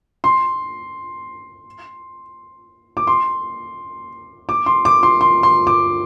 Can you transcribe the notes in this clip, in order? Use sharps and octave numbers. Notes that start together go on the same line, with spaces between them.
C6
D6
C6
D6
C6
D6
C6
C6
C6
D6